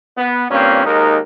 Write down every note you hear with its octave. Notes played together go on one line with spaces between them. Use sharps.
B3
G2 A#2 A#3 C4 C#4
D#2 G#3 D#4 A#4